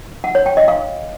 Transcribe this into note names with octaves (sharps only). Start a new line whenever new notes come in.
F#5
C#5
G5
D#5
F5